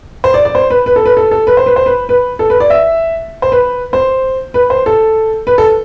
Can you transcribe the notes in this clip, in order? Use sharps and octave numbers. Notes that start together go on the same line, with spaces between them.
C5
D5
D5
C5
B4
B4
A4
B4
A4
A4
B4
C5
B4
C5
B4
B4
A4
B4
D5
E5
C5
B4
C5
B4
C5
A4
B4
A4